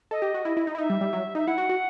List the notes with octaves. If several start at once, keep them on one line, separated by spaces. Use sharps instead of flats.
A4 D#5
G4
F#4
E4
E4
D#4
E4
D#4 E5
G3
G3
F#3
D#4 E5
E4 F#5
F#4
F#4